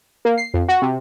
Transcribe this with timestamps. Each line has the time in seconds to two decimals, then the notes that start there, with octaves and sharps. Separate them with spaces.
0.25 A#3
0.38 C7
0.54 F2
0.68 F#4
0.82 C3